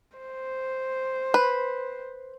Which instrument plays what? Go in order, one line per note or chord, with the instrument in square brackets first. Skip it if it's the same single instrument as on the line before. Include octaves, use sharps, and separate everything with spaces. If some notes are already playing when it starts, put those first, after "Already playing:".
[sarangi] C5
[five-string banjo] B4